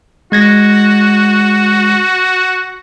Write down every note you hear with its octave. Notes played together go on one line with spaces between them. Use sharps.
G#3 F#4 G#6 A#6